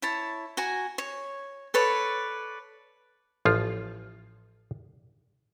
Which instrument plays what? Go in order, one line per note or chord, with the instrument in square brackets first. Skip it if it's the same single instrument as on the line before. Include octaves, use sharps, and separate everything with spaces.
[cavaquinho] E4 C#5 A5
F#4 G#5 A#5
C#5
A4 B4 C#5 D5
[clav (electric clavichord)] A1 F3 F4